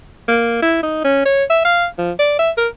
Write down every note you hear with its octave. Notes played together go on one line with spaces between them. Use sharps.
A#3
E4
D#4
C#4
C#5
E5
F5
F3
D5
E5
A#4